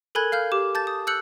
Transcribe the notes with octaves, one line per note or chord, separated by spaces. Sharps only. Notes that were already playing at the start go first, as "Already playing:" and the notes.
A4 A#4 G#5 B5 F#6 G#6
F5 F6 G6
G4 D6
A5 G6 A6
D#6
E6 F#6 G6 C#7 F#7